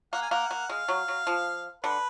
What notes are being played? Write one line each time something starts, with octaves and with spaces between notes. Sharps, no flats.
A#3 F#5
G#5
A#3 F#5
A#3
G#3 F5
F#3
F#3
F3
D3 B4